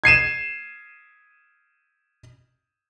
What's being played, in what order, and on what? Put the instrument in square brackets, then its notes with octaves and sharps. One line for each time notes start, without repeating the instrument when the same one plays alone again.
[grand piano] G#6 C7 D#7 E7